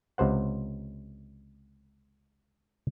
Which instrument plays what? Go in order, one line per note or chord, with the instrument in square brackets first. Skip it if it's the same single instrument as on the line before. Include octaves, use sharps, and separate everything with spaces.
[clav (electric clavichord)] C#2 C3 C5 F#5